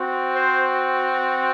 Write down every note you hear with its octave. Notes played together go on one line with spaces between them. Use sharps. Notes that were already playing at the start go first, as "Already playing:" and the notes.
Already playing: C4 F#4
C5